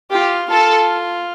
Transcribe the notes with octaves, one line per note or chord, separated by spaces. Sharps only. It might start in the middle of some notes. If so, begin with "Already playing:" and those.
F4 G4
F4 A4